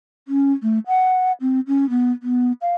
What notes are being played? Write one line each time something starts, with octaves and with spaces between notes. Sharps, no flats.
C#4
A3
F#5
C4
C#4
B3
B3
F5